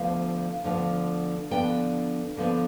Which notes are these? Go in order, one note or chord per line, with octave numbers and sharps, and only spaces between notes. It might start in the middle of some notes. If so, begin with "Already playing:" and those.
Already playing: D2 D3 F3 B3 F5
D2 D3 F3 B3
D3 F3 B3 D4 G5
D3 F3 B3 D4